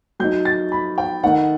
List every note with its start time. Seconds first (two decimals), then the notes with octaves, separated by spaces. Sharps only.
0.20 F#3 A3 D#4 G6
0.45 A6
0.72 B5
0.98 G5
1.23 D#3 A3 D#4 F#5